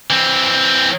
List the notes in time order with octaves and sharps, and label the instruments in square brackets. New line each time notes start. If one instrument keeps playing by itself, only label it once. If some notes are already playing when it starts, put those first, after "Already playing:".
[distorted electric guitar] E3 C4